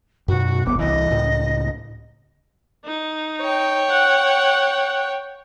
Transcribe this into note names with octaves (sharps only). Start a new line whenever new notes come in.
F#2 B2 F#4
D#1 G#1 B3 D6
C2 E3 D#5
C#2 A2
D#4
C#5 G5
F#5